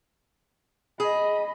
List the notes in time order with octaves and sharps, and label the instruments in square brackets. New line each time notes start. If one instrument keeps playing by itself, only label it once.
[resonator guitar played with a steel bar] G#4 [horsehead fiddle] D#5 B5